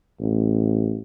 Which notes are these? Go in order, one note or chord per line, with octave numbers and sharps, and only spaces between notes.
A1